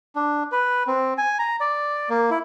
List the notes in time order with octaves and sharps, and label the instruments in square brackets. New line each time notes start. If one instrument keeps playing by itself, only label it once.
[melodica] D4
B4
C4
G#5
A#5
D5
A#3
E4